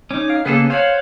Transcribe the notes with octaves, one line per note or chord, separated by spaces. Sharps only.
C#4 D#4 D6
F5
C#3 A#3 B3 G#4 A4
C5 C#5 F5 F#5